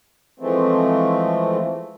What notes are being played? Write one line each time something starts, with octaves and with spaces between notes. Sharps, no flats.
E3 F3 G#3 A3 C4